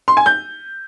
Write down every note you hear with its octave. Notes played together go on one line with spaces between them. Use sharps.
C6
G#5
G6